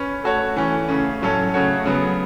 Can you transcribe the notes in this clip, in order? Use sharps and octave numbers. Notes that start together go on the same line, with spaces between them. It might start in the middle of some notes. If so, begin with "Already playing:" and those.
Already playing: C#4 B4
A3 F#4 A4 C#5
E3 A3 C#4
C#3 A3 C#4
A2 F#3 C#4 A4 C#5
C#3 A3 F#4 C#5
C#3 F#3 B3